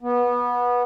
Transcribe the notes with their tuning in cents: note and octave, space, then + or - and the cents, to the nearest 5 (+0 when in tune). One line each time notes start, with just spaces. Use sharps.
B3 -20